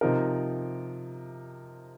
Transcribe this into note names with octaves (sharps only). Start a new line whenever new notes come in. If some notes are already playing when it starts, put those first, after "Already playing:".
C3 F3 D#4 A#4